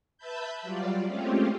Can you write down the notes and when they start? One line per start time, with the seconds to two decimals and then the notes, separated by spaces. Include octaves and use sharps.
0.18 B4 E5 A5 B5 G6
0.62 F#3 G3 F4 D5
1.07 G#3 A3 C4 C#4 F4 G4